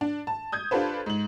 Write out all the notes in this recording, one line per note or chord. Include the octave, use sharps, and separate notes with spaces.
D4
A5
D#6 G6 G#6
D4 F4 G4 A4 B4 C5
G#2 F#7